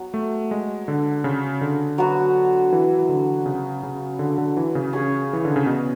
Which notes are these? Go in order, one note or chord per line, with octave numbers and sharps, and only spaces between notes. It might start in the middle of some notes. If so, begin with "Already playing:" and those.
Already playing: F#3 B3
A3
G#3
D3
C#3
D3
F#3 B3 F#4
E3
E3
D3
C#3
C#3
D3
D3
E3
C#3
C#4 G#4 C#5
E3
D3
C#3
B2